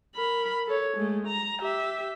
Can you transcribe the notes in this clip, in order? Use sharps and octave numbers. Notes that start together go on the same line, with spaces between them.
A#4 B5
A4 C#5
G#3 A3
A#5
G4 E5